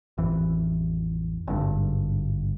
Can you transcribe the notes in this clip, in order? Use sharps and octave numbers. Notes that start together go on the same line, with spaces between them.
A1 F2 E3
G#1 G2 D3